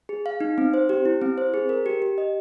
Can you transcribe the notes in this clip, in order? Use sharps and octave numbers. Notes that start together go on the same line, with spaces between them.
G#4
F5
D#4
C4
C5
G4
E4
C4
C5
G#4
A#4
G4
G4
D#5